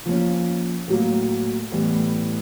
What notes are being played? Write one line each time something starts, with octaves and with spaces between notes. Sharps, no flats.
F3 A#3 C#4
A2 F#3 A#3
A2 E3 G3 B3